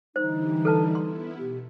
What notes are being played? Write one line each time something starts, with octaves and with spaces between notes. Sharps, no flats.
D3 E3 G3 D#4 C5
A4 B4 A5
B3 E4 C6
B2 G4